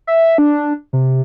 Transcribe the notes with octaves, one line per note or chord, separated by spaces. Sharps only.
E5
D4
C3